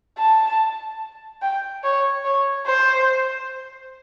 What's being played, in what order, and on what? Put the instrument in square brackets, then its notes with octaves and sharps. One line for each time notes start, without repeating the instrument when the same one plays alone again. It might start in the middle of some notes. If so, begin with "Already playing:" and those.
[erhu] A5
G5
C#5
C#5
C5